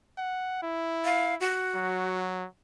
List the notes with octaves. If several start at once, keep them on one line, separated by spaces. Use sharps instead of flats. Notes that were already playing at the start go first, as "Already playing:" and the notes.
F#5
E4
F5
F#4
F#3